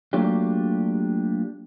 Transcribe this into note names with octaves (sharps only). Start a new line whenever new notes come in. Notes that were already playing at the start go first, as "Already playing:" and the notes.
F#3 A3 A#3 D4 F4 G4